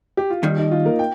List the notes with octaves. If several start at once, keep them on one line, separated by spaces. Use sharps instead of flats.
G4
F4
D#2 D#3 G3 D#4
D#4
F4
A#3 A#4
G5